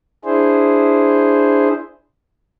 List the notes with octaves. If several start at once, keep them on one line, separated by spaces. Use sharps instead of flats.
D4 E4 G#4 C5